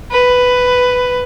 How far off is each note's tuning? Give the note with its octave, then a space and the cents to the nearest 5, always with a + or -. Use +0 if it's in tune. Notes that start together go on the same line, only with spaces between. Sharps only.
B4 +10